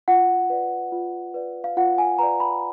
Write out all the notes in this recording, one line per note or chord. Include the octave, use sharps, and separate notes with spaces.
F4 F#5
B4 D5
F4
B4 D5
F5
F4 F#5
G#5
B4 D5 A#5
B5